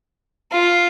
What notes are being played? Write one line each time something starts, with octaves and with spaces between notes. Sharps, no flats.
F4